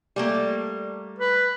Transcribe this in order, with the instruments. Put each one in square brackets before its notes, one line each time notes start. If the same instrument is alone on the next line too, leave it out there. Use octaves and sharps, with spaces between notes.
[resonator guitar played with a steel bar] G3 A3 A#3
[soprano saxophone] B4